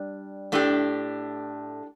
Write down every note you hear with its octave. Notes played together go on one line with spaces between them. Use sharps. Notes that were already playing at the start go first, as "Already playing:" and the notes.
Already playing: G3 D4
A2 A3 D4 G4